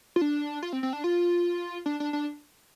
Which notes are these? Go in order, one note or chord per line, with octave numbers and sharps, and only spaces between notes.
F4
D4
F4
C4
C4
D4
F4
D4
D4
D4